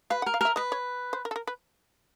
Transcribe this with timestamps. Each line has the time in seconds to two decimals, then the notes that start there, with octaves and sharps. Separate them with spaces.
0.10 B4 F5
0.22 F#5
0.26 A#4
0.34 F5
0.41 A#4 E5
0.56 B4 D#5
0.72 C#5
1.13 C5
1.25 A#4
1.31 A4
1.36 A#4
1.47 B4